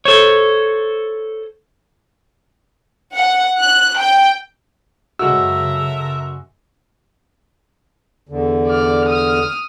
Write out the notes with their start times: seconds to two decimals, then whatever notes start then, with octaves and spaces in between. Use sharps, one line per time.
0.05 A4 C5 C#5
3.14 F#5
3.59 F#6
3.98 G5
5.19 F#2 C#3 G#3 F#4 A4 A#4 E5 E6
8.29 E2 D3
8.68 D5 F6
9.09 D#6 F6